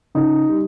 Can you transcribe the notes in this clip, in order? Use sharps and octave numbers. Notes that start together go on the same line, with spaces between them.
C#3 D#4
G3